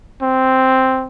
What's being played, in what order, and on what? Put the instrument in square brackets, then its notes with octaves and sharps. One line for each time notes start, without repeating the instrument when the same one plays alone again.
[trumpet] C4